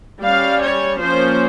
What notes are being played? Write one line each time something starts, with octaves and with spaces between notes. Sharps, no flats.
G3 C#4 F5
C#5
F3 A#3 C#4 C5